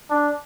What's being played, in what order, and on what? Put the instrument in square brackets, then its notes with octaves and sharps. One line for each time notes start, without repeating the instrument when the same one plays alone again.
[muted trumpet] D4